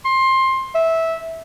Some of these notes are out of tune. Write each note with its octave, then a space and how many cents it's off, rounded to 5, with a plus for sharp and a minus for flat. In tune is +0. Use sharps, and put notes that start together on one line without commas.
C6 +20
E5 -10